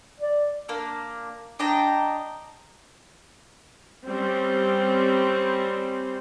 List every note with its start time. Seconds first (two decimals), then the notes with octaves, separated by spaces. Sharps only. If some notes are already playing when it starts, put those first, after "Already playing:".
0.20 D5
0.69 A#3 D4
1.59 D4 D#5 G5 A#5
4.07 G3 C4 C#4